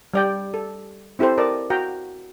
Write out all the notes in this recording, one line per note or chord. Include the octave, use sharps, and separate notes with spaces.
G3 D5 G5
A4
C4 E4 G4 A4 C5
A#4 D5 D#5 A5
F#4 F5 G5 A#5